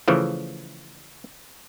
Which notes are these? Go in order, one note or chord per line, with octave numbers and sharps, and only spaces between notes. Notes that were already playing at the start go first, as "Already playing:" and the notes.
C#3 E3 F3 A3